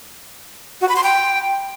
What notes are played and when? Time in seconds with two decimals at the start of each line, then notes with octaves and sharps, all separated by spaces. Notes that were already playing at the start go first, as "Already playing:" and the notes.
0.81 F#4
0.89 B5
0.96 C6
1.03 G5